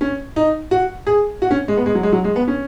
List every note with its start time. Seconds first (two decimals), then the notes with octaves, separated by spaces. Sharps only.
0.01 C#4
0.36 D#4
0.71 F#4
1.07 G#4
1.42 F#4
1.51 C#4
1.68 G#3
1.77 B3
1.86 G#3
1.95 F#3
2.03 G#3
2.12 F#3
2.24 G#3
2.36 B3
2.48 C#4